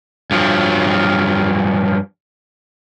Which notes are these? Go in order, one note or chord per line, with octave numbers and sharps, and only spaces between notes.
G2 F3 F#3